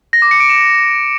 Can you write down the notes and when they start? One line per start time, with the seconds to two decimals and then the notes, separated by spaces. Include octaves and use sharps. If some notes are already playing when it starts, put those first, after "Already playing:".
0.13 A#6
0.22 D6
0.31 C#7
0.40 D7
0.49 E7